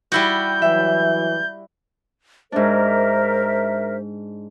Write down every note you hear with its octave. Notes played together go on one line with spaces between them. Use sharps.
G3 E4 F#4 G6
E3 F#3 E5
G#2 D4 A#4 C5 E5